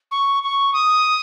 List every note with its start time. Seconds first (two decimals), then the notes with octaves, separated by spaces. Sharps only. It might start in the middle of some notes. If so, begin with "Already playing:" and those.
0.11 C#6
0.43 C#6
0.73 D#6